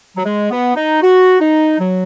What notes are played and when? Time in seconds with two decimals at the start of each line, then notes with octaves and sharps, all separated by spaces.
0.17 F#3
0.25 G#3
0.51 B3
0.76 D#4
1.02 F#4
1.40 D#4
1.79 F#3